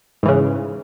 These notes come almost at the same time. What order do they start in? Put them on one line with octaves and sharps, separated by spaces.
G#2 E3 C#3